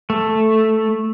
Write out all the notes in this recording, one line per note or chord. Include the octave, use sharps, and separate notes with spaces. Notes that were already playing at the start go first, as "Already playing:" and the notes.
A3